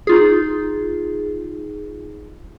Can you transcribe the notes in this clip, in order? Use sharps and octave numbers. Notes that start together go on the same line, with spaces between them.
D#4 F4 G#4